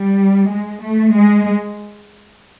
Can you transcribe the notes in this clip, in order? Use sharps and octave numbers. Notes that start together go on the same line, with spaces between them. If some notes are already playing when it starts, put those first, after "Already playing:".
Already playing: G3
G#3
A3
G#3